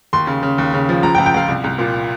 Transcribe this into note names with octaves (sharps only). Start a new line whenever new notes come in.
D#2 C6
C#3
C#3
D#2
C#3
F3
C#2 A#5
G5
C#2
G5
C#2 F5
C2
C2
A#2